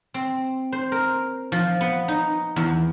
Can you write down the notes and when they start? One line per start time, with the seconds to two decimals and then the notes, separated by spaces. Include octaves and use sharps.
0.14 C4
0.72 C5
0.92 A#4
1.52 F3
1.81 B3
2.08 D#4
2.56 E2